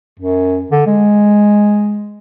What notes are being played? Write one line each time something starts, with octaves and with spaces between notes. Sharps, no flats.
F#2
D3
G#3